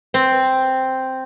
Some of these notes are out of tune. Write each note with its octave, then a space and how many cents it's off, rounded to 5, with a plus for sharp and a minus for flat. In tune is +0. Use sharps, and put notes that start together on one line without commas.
C4 +0